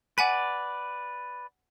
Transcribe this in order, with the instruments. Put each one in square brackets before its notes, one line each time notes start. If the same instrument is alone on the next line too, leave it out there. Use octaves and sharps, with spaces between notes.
[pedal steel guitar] B4 D5 [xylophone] F#5 G#5 B6